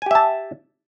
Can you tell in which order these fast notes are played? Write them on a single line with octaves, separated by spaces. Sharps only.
G#5 G4 E5 A5